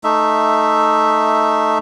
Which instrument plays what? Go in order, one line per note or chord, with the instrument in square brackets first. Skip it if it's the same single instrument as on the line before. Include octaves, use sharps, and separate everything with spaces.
[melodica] A3 D#4 E5